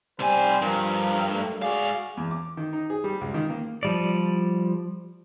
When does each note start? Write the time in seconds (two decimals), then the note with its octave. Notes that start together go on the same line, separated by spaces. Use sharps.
0.20 C3 G3 C5 G#5
0.62 G2 F3 A#4
1.27 A3 A#3
1.62 G#2 F#4 G#4 D5 F5
2.17 E2
2.31 D6
2.57 D#3
2.73 D#4
2.90 G#4
3.04 G3
3.21 C#2
3.34 D#3
3.50 A#3
3.83 F3 G3 D5